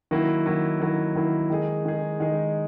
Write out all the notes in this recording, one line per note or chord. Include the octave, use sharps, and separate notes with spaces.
D#3 F#3 A#3 E4
D#3 F#3 A#3 E4
D#3 F#3 A#3 E4
D#3 F#3 A#3 E4
D#3 G#3 D#4 G#4
D#3 G#3 D#4 G#4
D#3 G#3 D#4 G#4